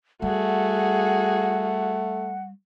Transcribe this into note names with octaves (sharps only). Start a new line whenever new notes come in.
G3 A3 F#4 G#4 F#5